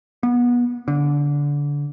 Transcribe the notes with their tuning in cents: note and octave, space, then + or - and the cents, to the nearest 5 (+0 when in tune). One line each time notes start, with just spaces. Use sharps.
B3 -25
D3 -20